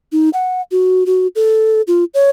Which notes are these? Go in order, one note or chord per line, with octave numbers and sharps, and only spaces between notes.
D#4
F#5
F#4
F#4
A4
F4
C#5